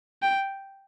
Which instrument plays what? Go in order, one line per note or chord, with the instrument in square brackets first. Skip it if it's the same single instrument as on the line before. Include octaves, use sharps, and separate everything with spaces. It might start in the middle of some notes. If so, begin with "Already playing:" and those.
[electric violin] G5